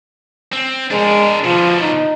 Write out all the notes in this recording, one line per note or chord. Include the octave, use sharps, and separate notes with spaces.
C4
G#3 D4 A#4
B2 D3 F3
D#4